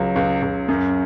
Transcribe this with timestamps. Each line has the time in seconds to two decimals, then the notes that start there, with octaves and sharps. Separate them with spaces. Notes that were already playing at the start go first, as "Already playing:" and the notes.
Already playing: C#2 F#3
0.16 C#2
0.42 C#2
0.68 F#2